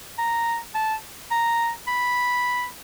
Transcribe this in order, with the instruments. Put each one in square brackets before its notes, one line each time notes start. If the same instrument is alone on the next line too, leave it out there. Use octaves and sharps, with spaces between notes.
[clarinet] A#5
A5
A#5
B5